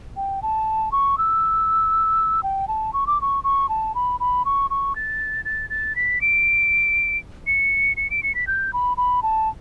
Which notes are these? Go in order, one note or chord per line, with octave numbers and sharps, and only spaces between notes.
G5
A5
C#6
E6
G5
A5
C#6
D6
C#6
C#6
A5
B5
B5
C#6
C#6
A6
A6
A6
B6
D7
C#7
C#7
D7
C#7
B6
G6
B5
B5
A5